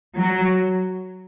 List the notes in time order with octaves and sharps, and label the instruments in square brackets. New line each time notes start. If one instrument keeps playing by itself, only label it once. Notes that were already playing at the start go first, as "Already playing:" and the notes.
[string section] F#3